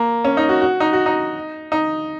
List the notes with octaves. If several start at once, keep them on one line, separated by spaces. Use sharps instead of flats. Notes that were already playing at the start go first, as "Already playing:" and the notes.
Already playing: A#3
C#4
D#4
F#4
F#4
D#4
F#4
D#4
D#4